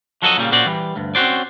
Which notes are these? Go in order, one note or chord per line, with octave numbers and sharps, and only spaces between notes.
F3 F#3 F#4 A4 A#4 D#5
A#2 C#3 F#3 G3 A#3
A#2 C#4 F#4 C5 D5
E3 G3
D2 G2
C4 C#4 F4 F#4 C5 D5